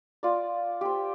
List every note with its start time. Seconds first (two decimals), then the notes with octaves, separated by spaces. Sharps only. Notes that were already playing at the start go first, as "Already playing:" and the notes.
0.23 F4 D5
0.81 G4 C5